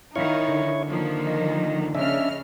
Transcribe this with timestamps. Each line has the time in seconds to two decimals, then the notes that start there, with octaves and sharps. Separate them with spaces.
0.16 D#3 D#4 E4 C#5 F5 C#6
0.48 D3
0.90 D#3 F3 A#3
1.27 D#5
1.95 C#3 C#4 D4 D#5 E5 F6